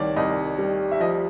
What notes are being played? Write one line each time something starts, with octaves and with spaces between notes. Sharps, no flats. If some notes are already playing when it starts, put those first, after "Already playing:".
Already playing: C2 D#3 C#5 D5
C2 D#5
G3
E5
F3 D#5